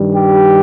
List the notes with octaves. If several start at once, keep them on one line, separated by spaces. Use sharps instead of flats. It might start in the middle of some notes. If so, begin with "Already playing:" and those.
Already playing: G2 D#3 G3
G4